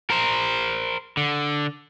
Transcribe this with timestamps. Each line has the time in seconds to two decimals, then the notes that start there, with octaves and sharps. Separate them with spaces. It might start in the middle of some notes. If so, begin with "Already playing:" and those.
0.10 A#4 C5
1.17 D3